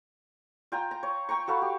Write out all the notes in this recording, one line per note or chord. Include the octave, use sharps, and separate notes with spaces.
F4 G5 G#5 A#5
A#5
C#5
G5 A#5 C#6
F#4 A4 F5 B5
G4